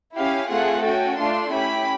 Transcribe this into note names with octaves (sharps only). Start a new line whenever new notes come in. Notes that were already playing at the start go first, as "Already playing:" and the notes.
C#4 E4 G4 F5
A3 C4 F4 G#4 F#5
C#4 F#4 A4 G5
A3 D4 F4 C6
C#4 E4 G4 B5